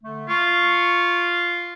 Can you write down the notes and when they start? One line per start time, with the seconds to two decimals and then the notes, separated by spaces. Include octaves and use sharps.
0.03 D3 A3
0.29 F4 C#6